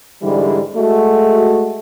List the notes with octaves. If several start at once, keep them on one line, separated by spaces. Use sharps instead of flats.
G#2 D3 E3 G3
G#3 A3 F#4